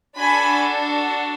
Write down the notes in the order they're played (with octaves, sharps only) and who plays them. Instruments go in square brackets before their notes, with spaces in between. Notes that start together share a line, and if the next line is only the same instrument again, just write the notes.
[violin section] D4 F#4 A4 G#5 B5